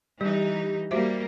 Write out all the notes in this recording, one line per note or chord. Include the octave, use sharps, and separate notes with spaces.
E3 G3 D#4 G4
G3 A#3 F#4 C5 E5